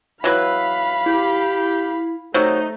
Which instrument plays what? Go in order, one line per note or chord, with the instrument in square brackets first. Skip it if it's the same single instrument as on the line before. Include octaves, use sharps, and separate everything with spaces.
[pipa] E3 F#3 B4 [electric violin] F5 B5
[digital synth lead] E4 [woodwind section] G4
[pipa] C3 F#3 [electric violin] A3 [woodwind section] D#4 [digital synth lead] C5